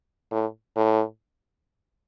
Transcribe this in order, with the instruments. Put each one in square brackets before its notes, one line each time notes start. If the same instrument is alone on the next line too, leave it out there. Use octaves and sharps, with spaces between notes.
[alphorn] A2
A2